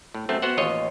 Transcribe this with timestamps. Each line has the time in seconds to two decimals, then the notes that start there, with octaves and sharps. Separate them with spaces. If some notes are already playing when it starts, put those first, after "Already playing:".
0.14 A2
0.29 F#2 A3 C4
0.42 B3 F#4 C5 F#5
0.57 A1 D#2 F4 C#5 D#5